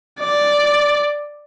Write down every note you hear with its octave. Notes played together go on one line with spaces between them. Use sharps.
D5